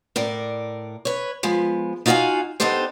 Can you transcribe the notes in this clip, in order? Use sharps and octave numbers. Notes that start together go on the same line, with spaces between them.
A2 A#4 D5
B4 C#5
F3 G#3 B3
D#4 F4 F#4 A#4 F5 G#5
B3 D4 D#4 G4 A4 C5